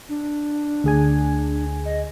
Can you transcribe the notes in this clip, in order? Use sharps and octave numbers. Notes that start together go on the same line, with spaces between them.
D4
D2 G#4 G#5
D#5